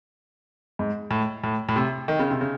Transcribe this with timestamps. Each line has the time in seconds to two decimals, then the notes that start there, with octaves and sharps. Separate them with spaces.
0.79 G#2
1.11 A2
1.44 A2
1.69 A2
1.76 C3
2.08 D#3
2.19 C#3
2.30 C3
2.41 C#3